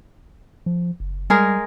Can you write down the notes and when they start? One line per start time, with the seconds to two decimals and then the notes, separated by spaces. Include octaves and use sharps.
0.66 F3
1.00 F#1
1.30 G3 G#3 G#4 A#4